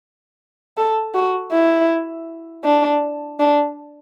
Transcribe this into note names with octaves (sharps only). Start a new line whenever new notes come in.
A4
F#4
E4
D4
D4